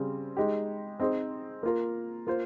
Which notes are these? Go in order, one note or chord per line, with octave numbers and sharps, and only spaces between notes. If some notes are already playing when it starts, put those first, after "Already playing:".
Already playing: C#3 G3 C4
G#3 D#4 G4
C4 D#4 G#4 C5
A#3 F4 A#4
A#3 F4 C5